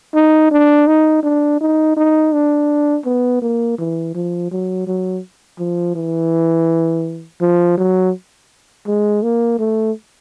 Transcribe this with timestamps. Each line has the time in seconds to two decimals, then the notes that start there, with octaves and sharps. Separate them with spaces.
0.14 D#4
0.51 D4
0.87 D#4
1.23 D4
1.61 D#4
1.97 D#4
2.33 D4
3.05 B3
3.42 A#3
3.78 E3
4.15 F3
4.51 F#3
4.87 F#3
5.59 F3
5.95 E3
7.41 F3
7.77 F#3
8.87 G#3
9.23 A#3
9.59 A3